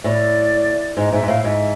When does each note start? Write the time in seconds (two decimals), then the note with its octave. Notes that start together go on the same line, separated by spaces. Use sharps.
0.03 A2 D5
0.97 G#2 D#5
1.12 G#2 E5
1.23 G#2
1.28 A2 F5
1.44 G#2 E5